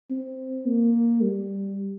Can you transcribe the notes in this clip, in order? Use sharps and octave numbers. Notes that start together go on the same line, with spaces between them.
C4
A#3
G3